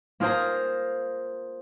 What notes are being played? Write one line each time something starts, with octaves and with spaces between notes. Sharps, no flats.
A#3 F4 G#4 C5 A#5